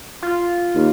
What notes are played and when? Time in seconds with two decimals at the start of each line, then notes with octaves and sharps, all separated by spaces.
0.22 F4
0.75 D#2